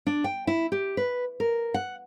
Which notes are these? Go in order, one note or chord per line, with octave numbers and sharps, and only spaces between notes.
D4
G5
E4
G4
B4
A#4
F#5